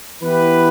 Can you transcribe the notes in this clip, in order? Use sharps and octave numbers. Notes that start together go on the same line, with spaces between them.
E3 B3 E4 G4 B4